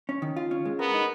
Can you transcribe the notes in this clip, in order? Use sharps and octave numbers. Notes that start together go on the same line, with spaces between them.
C#4
D#3
F4
C#4
G#3
B3 A#4
D#4